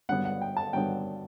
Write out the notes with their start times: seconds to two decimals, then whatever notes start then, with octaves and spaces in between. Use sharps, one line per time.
0.09 G2 D3 F#3 B3 F#5
0.25 F#5
0.41 G5
0.57 A5
0.73 G2 D3 F#3 B3 G5